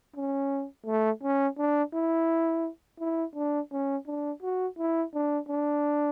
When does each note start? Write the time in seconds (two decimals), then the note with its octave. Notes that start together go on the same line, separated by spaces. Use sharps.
0.16 C#4
0.86 A3
1.23 C#4
1.58 D4
1.94 E4
3.00 E4
3.35 D4
3.72 C#4
4.07 D4
4.42 F#4
4.79 E4
5.14 D4
5.49 D4